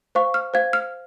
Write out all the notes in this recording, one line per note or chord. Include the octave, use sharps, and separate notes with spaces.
C5 F5 C#6
F6
C5 F5 G#6
F6